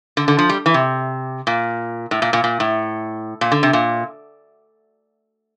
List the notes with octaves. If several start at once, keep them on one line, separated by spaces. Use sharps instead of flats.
D3
D3
F3
G3
E3
C3
A#2
A2
A#2
A#2
A#2
A2
A#2
D3
C3
A#2